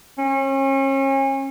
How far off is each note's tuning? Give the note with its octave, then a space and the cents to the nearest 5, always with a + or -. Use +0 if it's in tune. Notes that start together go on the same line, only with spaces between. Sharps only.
C#4 -35